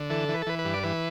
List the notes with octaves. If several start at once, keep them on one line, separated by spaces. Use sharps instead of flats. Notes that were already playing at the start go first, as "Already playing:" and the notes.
Already playing: D3
E3 A4
E3
B4
A4
E3 B4
B4
G2
D5
E3 B4